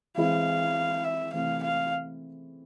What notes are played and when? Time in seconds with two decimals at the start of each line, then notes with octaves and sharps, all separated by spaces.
0.17 E3 G#3 C4 E4 F5
1.04 E5
1.33 C3 E3 A3 C4 E4 F5
1.63 F5